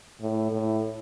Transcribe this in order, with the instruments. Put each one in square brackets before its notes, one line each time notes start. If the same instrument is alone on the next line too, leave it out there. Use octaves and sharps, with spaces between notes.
[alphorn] A2
A2